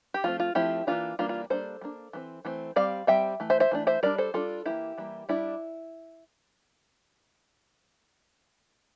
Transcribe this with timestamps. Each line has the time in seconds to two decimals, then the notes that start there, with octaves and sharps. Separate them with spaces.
0.14 G4
0.24 F3 A3 C4 F4
0.40 F4
0.55 F3 A3 C4 E4 G4
0.87 E3 G3 A#3 D4 F4
1.19 E3 G3 A#3 D4 F4
1.29 F4
1.50 G3 A#3 D4 A4 C5
1.81 G3 A#3 D4
2.13 E3 A3 C4
2.45 E3 A3 C4
2.76 G3 C4 D5 F5
3.07 G3 C4 E5 G5
3.40 E3 A3
3.50 C5 E5
3.60 C5 E5
3.71 E3 A3 D4
3.87 C5 E5
4.03 G3 D4 A#4 D5
4.18 A4 C5
4.34 G3 D4 F4 A4
4.65 E3 G3 A#3 E4 G4
4.98 E3 G3 A#3
5.29 G3 D4 E4